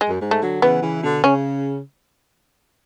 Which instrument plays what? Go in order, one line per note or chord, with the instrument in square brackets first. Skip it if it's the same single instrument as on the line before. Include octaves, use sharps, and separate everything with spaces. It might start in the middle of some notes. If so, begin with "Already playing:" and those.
[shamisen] G#3
[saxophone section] F#2
G#2
[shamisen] A3
[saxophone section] D3 F#3
[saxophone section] C#3 E3 [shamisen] B3
[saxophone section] C#3 E3
B2 D3
[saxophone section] C#3 [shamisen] C#4